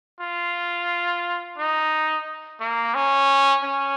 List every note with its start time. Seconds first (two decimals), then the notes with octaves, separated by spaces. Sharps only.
0.20 F4
1.58 D#4
2.61 A#3
2.94 C#4
3.63 C#4